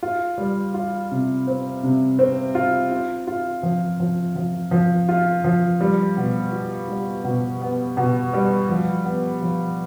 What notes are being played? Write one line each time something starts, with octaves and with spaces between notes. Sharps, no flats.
F4
G3
F4
C3
C4
C3
C4
F4
F4
F4
F3
F3
F3
F3
F4
F3
G3
B2
F4
G3
B2
B3
B2
G3
F3
B3
F3